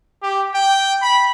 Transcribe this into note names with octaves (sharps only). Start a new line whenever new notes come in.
G4
G5
B5